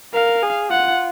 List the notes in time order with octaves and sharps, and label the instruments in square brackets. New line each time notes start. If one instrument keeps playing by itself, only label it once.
[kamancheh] A#4 [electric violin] F5
[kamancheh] G#4
[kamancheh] F4 [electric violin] F#5